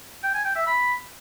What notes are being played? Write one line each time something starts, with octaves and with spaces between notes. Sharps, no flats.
G5
G#5
G5
E5
B5